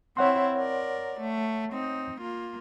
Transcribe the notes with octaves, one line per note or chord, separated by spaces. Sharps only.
C4 E4 C#5 F#5 C6
A#4 D5
A3
C4 D#4
A#3 F4